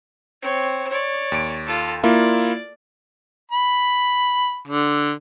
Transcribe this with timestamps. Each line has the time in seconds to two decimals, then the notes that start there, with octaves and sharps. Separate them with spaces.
0.41 C4 C#5
0.89 C#5 D5
1.32 D#2 D7
1.66 F4 A4
2.03 A#3 E4 F4 D5
3.51 B5
4.67 D3